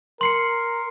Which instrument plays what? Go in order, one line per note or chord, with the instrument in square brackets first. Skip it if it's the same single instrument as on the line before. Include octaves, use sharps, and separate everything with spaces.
[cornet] A#4 [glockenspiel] C6 C7 C#7